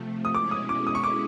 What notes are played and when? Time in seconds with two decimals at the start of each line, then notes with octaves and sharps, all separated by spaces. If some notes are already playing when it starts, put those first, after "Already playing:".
Already playing: C3 F3 A3
0.25 D#6
0.34 B2 G#3 C#4 E4 D6
0.51 D#6
0.69 D6
0.87 D#6
0.95 C#6
1.04 D6